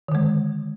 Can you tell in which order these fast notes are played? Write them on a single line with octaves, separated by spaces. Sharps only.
D#3 D3 G#3